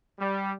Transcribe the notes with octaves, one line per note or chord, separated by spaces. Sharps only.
G3